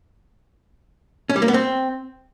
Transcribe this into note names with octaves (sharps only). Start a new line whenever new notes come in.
C#4
G3
A#3
B3
C4